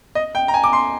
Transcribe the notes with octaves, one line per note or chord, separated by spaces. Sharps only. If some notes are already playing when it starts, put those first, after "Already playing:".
D#5
G5
A#5
G#5
D6
C6